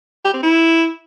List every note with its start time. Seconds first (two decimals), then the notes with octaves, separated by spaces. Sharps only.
0.25 G4
0.34 C4
0.43 E4